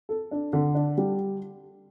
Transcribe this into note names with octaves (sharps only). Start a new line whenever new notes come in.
A4
D4
D3
D4
G3